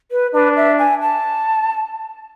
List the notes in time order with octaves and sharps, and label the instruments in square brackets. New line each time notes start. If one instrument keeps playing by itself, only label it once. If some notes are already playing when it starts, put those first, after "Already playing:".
[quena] B4
[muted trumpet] D4 [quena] B4
[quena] E5
G#5
A5